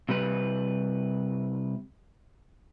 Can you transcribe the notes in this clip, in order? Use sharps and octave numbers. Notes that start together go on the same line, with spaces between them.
C3 G3 B4